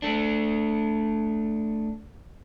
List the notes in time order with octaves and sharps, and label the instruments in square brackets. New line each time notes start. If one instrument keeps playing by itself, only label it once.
[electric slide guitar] A3 D4